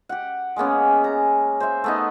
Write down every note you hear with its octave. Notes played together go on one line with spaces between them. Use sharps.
G4 F#5
G#3 A#3 B3 C#4
A#5
C5 E5
A3 B3 D#4